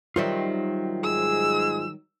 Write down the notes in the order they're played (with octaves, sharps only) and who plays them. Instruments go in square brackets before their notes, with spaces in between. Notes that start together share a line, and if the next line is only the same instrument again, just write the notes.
[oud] D#3 F#3 G3 [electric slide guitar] F4 C5 E5
[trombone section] G#2 G#3 G#4 [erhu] E6